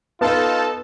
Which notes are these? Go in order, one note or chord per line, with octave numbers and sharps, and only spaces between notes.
B3 D#4 F4 A4 A5